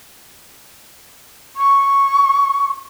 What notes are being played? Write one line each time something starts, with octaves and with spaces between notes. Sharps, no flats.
C#6